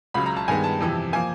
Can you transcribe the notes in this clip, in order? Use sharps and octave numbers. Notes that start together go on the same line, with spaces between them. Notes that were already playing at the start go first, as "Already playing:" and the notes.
C#2 C#3 F#3 B5
A#5
A5
G2 D#3 G#3 B3 G#5
A5
F2 C3 E3
F3 A#3 G#5